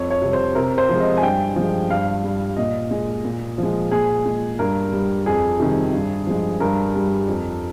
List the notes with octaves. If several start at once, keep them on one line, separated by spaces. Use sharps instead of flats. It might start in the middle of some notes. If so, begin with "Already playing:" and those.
Already playing: F2 C#5
C#5
C3 G3
C5
C3 A#4
C5
F3 G#3
D#5
G#5
G2 G5
F3 G#3
G2 F5
G3
A#2 D#5
G#3
A#2
F3
G#3
A#2 G#4
G#3
G2 A#4
G3
F2 G#4
C3 D#3 G3
G2
F3 G#3
G2 A#4
G3
F2